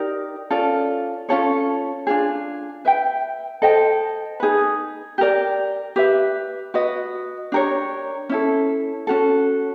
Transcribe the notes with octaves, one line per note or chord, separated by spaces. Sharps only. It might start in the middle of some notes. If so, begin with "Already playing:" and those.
Already playing: D#4 G4 A#4 D5
C#4 F4 A4 D5
C#4 F4 A4 C#5
D4 F4 G#4
B4 E5 G5
A4 C5 D#5 G5
D#4 G#4 B4
G4 A#4 D5
G4 B4 E5
F#4 B4 D#5
D4 G4 A#4 C#5
C#4 E4 A4
C#4 F#4 A4